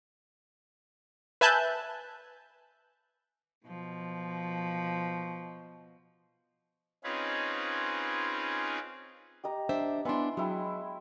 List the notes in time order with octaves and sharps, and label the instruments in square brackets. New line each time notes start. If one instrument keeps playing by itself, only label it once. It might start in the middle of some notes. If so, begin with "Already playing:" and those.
[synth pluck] B4 E5 G#5 A5 F#6 G6
[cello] B2 F3
[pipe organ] C4 C#4 D#4 F4 G#4 B4
[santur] G4 D#5 A#5
[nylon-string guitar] D4 C5 E5
[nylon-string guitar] B3 D4 [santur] E4 G#5 C6
[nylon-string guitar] F#3 [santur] G#3 E4 G5